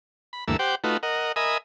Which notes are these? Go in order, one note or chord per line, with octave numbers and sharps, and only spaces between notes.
B5
D2 G2 E3 A3 A#3 E6
G4 C5 F#5 G5 D6
A3 D#4 F4 F#4 B4
A#4 D#5 F#5
A#4 D#5 E5 G#5 B5 D#6